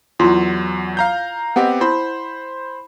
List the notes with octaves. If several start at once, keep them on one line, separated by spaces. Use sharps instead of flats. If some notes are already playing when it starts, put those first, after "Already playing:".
E2 F#3 E4 F4 C6
F5 A#5 G6
B3 C4 G4 D#5 F#5
E4 C5 B5